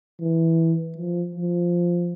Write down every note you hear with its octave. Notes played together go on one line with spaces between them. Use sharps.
E3
F3
F3